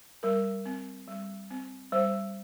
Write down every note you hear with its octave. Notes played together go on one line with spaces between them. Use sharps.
G3 A#4
C4
G3
C4
G3 C5